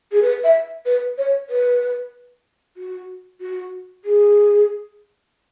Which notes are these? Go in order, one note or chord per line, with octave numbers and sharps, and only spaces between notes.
G#4
B4
E5
B4
C#5
B4
F#4
F#4
G#4